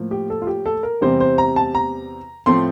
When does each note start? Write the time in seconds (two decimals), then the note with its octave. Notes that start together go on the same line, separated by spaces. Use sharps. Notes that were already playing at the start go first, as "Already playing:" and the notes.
Already playing: A2 F3 A#3
0.11 G4
0.30 A4
0.42 F4
0.47 G4
0.66 A4
0.83 A#4
1.01 E2 C3 G3 C4 C5
1.20 C5
1.38 A#5
1.56 A5
1.75 A#5
2.46 A2 F3 A3 C4 C6